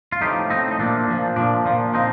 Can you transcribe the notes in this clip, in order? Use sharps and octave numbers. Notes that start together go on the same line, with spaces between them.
F4
A2 F3 D#4 G4
A2 F3 C4 D#4
D#4
A#2 F3 D4
A#2 F3
A#2 F3 D4
A#2 F3
F3 C4 D#4